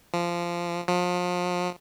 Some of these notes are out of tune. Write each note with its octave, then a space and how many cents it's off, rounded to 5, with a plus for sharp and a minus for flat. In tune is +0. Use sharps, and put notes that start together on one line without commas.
F3 -15
F3 +35